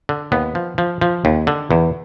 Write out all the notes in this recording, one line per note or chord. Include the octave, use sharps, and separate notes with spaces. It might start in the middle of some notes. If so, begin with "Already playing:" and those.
D3
D#2 B3
F3
F3
F3
D#2
D3
E2